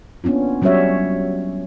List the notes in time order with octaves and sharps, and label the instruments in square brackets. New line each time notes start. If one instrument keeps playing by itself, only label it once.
[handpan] A#3 B3 C#4 D4 F4
F#3 G3 C#4 F#4 C#5 E5